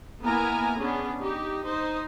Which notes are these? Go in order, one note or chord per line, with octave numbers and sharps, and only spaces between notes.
A#3 B3 E4 A#4 G#5 A#5
B3 C#4 D4 G#4
D#4 G4
D#4 C5